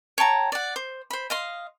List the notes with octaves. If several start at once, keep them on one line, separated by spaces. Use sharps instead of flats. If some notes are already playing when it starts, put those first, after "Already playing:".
C#5 G5 A5 A#5
D5 F#5
C5
C5 B5
D#5 F5 C6